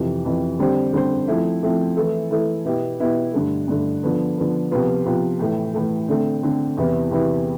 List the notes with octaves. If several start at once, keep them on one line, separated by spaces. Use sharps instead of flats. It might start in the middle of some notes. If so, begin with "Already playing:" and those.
Already playing: F2 C3 E3
F2 C3 E3
D3 G3 C4 G4 C5
D3 G3 C4 G4 C5
F3 A3 C4 E4
F3 A3 C4 E4
E3 A3 E4 A4
E3 A3 E4 A4
B2 B3 E4 G4
B2 B3 E4 G4
G2 D3 A3
G2 D3 A3
D3 F3 B3
D3 F3 B3
C3 F3 B3 F4 B4
C3 F3 B3 F4 B4
A2 E3 A3
A2 E3 A3
D3 A3 C4
D3 A3 C4
E2 C3 E3 B3 E4
E2 C3 E3 B3 E4